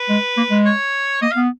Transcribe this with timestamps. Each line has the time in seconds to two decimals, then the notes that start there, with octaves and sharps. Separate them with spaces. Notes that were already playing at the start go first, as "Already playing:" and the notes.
Already playing: B4
0.09 G#3
0.37 A#3
0.51 G#3
0.66 C#5
1.21 A#3 D#5
1.31 F5
1.36 B3